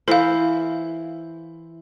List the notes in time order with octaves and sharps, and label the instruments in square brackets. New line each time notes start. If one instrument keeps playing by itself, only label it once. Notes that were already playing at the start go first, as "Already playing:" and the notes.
[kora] E3 E4 C5 [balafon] A4 F5